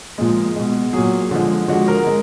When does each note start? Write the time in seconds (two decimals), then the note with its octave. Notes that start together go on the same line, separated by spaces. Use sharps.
0.18 A#2 F3 G#3
0.56 B2 G#3
0.93 A#2 F#3 G#4
1.31 D3 F3 G#3
1.68 D3 F3 G#3 F#4
1.88 A#4
2.07 G#3